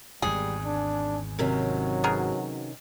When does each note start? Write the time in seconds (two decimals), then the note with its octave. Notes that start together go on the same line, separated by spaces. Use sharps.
0.22 G#1 E2 G#2 G3 G#4
0.65 D4
1.39 C3 D#3 F#3 C#4
2.04 B2 G#4 A#4